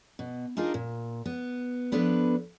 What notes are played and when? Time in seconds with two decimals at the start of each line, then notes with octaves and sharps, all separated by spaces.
0.19 B2
0.57 D4 D#4 F4 G#4 A#4
0.74 A#2
1.26 B3
1.92 F3 B3 D4 A4 B4